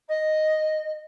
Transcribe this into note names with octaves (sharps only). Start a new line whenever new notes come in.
D#5